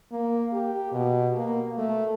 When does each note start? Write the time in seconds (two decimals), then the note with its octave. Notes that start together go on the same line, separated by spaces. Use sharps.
0.12 A#3
0.53 G4
0.92 B2
1.36 A#3
1.78 A3